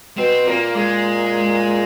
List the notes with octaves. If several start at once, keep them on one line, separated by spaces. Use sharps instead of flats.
B2 C4
A#2 A#3
G#3